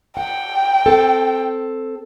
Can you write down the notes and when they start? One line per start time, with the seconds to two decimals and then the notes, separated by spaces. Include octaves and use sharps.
0.17 F#5 G5
0.86 C4 A4